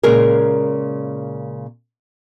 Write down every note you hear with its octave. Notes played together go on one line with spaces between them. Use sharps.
A#2 C#3 G#3 G#4 A#4